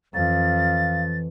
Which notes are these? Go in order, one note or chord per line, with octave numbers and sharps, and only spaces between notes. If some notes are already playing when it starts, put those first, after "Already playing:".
F2 E3 F5 A6